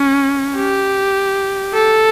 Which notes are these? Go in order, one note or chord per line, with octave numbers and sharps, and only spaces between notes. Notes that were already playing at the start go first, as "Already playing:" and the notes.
Already playing: C#4
G4
A4